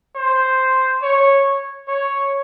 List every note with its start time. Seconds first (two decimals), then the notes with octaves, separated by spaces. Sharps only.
0.16 C5
1.02 C#5
1.88 C#5